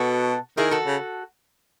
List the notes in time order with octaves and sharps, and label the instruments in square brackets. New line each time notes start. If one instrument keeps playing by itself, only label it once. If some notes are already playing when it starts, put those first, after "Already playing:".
Already playing: [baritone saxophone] B2 [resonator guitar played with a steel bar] F#4 A4
[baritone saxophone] D#3 [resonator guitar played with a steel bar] E4 G#4
[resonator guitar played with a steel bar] F#4 A4
[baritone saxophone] C#3